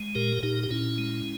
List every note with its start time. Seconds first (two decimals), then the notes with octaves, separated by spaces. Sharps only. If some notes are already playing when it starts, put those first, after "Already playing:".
Already playing: G#3
0.15 A#2 G4 A#4
0.43 A#2 D#4 G4
0.63 G4
0.70 A#2 C#4 E4
0.98 G#3